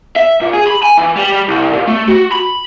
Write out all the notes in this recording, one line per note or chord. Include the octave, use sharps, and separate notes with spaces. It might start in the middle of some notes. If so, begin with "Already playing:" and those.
E5
A#2
G#4
B5
G#5
E3
G3
C2
A#2
A3
F#4
B5